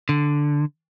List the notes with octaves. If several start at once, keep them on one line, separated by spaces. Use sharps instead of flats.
D3